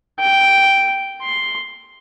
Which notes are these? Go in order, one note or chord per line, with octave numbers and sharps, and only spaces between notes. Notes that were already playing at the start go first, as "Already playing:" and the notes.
G5
C6